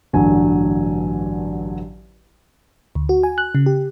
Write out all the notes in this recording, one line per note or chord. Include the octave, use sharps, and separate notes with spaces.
A1 G2 D3 F#3 G#5
D2
F#4
G#5
F#6
C#3
G4